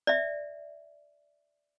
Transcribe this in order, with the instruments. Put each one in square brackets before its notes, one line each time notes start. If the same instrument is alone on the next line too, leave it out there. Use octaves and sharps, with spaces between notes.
[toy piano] D5 E5